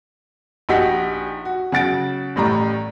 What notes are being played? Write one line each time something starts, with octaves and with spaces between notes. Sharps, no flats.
A#1 D#4 F#4 G4 F#5 B6
F#4
C#3 F#3 F#5 A6 D7
A1 A2 G3 A#5